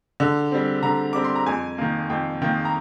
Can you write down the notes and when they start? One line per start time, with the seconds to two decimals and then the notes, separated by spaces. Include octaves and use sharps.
0.20 D3
0.51 G3 C4
0.83 D3 A#5
1.13 G3 C4 D6
1.24 C6
1.35 A#5
1.46 F2 G#5
1.78 D#3 A#3
2.10 F2 G5
2.42 D#3 A#3 G5
2.65 A#5